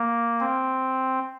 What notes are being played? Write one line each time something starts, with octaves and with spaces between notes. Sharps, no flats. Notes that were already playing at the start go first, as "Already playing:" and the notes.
Already playing: A#3
C4